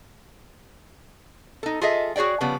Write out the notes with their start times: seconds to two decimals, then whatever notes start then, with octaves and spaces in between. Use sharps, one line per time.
1.63 D#4 A4
1.81 F4 G#4 A4 D#5 E5
2.16 F#4 G#4 C#5 D5 G5
2.41 C#3 F3 G3 B3